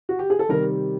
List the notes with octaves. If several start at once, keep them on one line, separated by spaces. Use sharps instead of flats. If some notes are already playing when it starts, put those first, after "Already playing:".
F#4
G4
G#4
A4
C3 D#3 G3 A#4